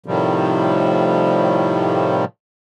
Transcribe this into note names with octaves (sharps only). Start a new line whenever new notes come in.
A2 C3 D#3 F3 G3